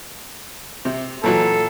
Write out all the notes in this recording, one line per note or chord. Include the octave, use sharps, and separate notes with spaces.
C3
A#2 E3 F#3 A4